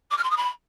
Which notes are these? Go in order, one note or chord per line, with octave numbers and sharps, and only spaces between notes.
D6
F6
C6
D#6
B5